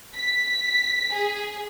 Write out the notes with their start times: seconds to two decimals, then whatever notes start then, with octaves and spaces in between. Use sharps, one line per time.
0.15 B6
1.14 G#4